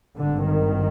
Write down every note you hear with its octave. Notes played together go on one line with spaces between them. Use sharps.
G#1 G2 D3
D#3